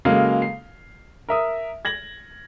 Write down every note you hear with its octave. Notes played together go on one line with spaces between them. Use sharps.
C#3 F#3 G#3 A#3 A4 F5
C7
A#4 E5 D#6
G#6 A#6 F#7